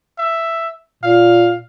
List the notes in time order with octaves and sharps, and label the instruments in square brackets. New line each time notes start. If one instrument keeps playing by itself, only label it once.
[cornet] E5
[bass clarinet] A#2 [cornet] F5